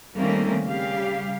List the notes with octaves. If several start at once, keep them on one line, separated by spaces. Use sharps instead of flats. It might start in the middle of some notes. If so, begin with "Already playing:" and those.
D#3 G3 A3 A#3 C4 C#4
C#3 G3 G4 F5